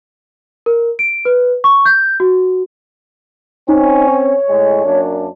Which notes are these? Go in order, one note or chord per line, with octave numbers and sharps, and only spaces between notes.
A#4
D7
B4
C#6
G6
F#4
C4 C#4 D#4
C#5
A2 G#3
F#2 A#3 D4